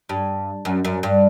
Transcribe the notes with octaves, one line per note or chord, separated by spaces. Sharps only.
G2
F#2
F#2
G2